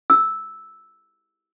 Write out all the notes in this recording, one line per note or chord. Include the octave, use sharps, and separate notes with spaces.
E6